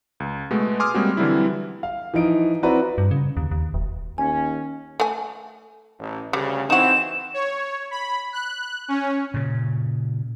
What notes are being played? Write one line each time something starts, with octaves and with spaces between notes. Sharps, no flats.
C#2
B2 G#3 A3 B3
G#5 C6 D6 D#6 F6
G3 G#3 A#3 C4 F#4 G#4
D3 E3 F#3 G3 C4 E4
F5
E3 F3 D#4 D7
C4 E4 F#4 B4 D5 A#5
G2
C#3
D#2
D#2
E1
D#2 C#4 G#5
A3 G#5
A1
D2 C#3 G3
E3 C4 D#4 F#4 E7
C#5
B5
F#6
C#4
A#2 C#3